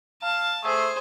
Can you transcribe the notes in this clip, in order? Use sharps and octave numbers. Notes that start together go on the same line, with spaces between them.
F5 A5
A3 G#4 C5